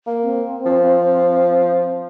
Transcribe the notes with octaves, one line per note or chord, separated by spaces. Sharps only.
A#3
C4
F3